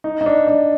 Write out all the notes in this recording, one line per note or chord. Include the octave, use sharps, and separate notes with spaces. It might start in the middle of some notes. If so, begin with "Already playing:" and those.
D#4
D#4
D4
D4